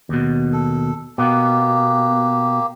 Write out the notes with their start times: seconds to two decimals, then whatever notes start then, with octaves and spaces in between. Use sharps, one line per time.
0.09 D#2 B2
0.53 A4
1.18 B2 A#3 B3 G4